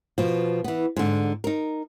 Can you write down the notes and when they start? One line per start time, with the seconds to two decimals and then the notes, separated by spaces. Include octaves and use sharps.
0.18 B2 F3
0.64 E3 B3
0.96 G#2 D3
1.44 D#4 A#4